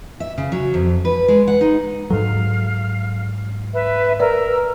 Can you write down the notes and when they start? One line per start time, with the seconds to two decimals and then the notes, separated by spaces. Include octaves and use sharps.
0.20 E5
0.38 C#3
0.52 F#3
0.74 F2
1.05 B4
1.28 G#3
1.47 F#5
1.61 D#4
2.10 G#2 F#3 A4 F5
3.73 B4 E5
4.20 A#4 B4 D5 E6